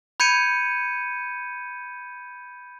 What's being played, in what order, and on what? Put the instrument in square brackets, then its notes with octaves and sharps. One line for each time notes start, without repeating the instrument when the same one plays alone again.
[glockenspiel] B5 G6 G#6 C#7 D#7